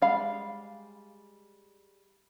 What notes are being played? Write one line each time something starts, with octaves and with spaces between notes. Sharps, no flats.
G3 G#3 F5 B5